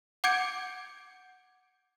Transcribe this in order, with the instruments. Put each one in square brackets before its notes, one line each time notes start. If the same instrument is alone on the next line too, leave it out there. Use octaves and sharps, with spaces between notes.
[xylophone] F#5 D6 G6 G#6 C#7 D7